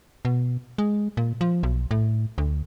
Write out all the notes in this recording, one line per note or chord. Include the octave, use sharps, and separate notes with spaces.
B2
G#3
A#2
F3
B1
A2
D2